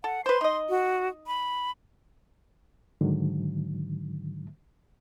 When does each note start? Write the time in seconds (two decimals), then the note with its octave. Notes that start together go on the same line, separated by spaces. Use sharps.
0.04 A4 F#5
0.26 B4 C5 C6
0.41 D#4 D#5
0.69 F#4
1.27 B5
3.01 G#2 D3 D#3 F#3